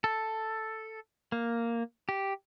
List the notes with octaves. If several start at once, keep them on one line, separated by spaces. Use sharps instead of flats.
A4
A#3
G4